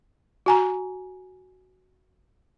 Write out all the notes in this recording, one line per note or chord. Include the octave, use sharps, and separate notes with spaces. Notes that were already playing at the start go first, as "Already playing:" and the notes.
F#4 G#5 A#5